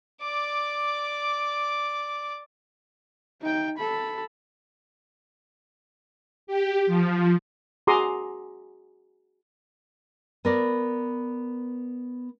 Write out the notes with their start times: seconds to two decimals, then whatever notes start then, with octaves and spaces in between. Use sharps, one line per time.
0.21 D5 D6
3.42 D#4 G5
3.77 A4 B5
6.47 G4
6.87 F3
7.87 F#4 G#4 A#5 C6 D6 D#6
10.45 B3 A#4 D5